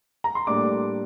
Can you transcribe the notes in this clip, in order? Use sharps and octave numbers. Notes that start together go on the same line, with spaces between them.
A#5
C6
A2 G3 A#3 D4 D6